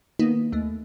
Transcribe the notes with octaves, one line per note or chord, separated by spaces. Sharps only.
D#3 A#3 B3 D#4
D#2 A3